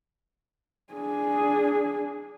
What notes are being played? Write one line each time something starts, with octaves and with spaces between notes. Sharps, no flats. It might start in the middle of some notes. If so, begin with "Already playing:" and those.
D4 G#4